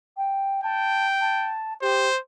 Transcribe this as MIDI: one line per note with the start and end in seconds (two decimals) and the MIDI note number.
0.17 0.61 79
0.64 1.55 79
0.64 1.07 81
1.21 1.74 81
1.82 2.08 67
1.82 2.18 72